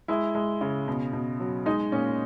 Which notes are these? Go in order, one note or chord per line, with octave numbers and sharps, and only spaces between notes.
G#3 E4
G#3
C#3
B2
B2
F#3
G#3 D#4
A#2 C#4